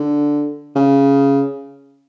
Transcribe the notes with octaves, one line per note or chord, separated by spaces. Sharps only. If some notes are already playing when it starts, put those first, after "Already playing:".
Already playing: D3
C#3